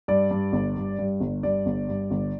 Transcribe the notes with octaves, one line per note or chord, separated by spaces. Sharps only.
G2 D5
G2
G1
G2
G2
G1
G2 D5
G1
G2
G1